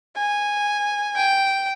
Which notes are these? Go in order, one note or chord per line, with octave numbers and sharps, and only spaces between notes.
G#5
G5